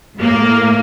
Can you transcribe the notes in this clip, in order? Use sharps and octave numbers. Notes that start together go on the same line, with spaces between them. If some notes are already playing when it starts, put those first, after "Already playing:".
A2 A#3